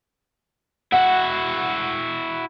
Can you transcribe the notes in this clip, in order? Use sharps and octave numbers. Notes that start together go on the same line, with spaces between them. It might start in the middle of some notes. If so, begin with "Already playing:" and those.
E4 F#4 F#5